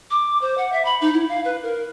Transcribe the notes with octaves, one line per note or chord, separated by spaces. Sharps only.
D6
C5
F#5
E5
B5
D#4
E4
F5
B4
A#4